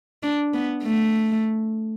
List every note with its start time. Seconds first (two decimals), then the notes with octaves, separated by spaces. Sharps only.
0.23 D4
0.54 B3
0.83 A3